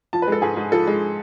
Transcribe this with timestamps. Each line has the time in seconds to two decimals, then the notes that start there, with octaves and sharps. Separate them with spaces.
0.13 F3 A5
0.22 B4
0.27 G#3 A4
0.42 G#2 G#4
0.57 G#2
0.72 F3 A4
0.87 G#3